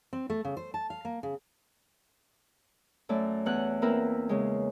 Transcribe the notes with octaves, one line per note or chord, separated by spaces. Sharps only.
C4
A3
C#3
C5
A5
F5
A#3
C#3
F#2 A3 D5
E2 F#5 F#6
A#3 C4 E4 A#4 B4
C#3 G#3